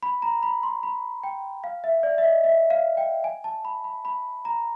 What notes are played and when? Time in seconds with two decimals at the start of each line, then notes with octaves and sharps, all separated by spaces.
0.03 B5
0.22 A#5
0.43 B5
0.63 C6
0.83 B5
1.23 G5
1.64 F5
1.84 E5
2.03 D5
2.18 E5
2.24 D#5
2.44 E5
2.70 F5
2.97 G5
3.24 G#5
3.44 A5
3.65 B5
3.84 B5
4.05 B5
4.45 A#5